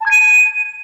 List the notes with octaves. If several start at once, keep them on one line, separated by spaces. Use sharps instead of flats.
A5
G#6
D#7